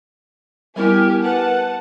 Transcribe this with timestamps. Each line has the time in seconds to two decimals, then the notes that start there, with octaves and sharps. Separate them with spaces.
0.76 G3 B3 E4 G4 A#4 G#5
1.23 B4 F#5 A5